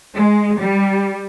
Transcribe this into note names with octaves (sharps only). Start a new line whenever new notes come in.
G#3
G3